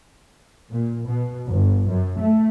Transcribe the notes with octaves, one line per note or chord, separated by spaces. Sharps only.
A#2
B2
G1
F#2
A3